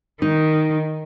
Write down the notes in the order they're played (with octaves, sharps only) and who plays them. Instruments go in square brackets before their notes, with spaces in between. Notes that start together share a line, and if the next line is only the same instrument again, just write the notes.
[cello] D#3 [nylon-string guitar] D#4